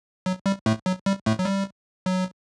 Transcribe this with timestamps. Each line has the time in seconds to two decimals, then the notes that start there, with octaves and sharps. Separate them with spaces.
0.26 F#3
0.46 G3
0.66 A2 A3
0.86 F#3
1.06 G3
1.26 A2 A3
1.39 F#3
1.45 G3
2.06 F#3